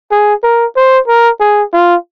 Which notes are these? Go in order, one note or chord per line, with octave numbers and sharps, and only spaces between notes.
G#4
A#4
C5
A#4
G#4
F4